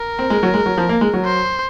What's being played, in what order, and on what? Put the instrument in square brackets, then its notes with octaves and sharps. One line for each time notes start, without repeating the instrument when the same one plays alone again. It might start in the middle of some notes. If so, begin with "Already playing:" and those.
Already playing: [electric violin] A#4
[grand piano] C4
G#3
F#3
G#3
F#3
F3
A#3
G#3
F#3
[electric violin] C5